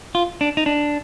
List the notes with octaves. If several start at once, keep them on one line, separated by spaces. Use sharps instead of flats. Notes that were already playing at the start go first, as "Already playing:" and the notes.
F4
D4
D#4
D4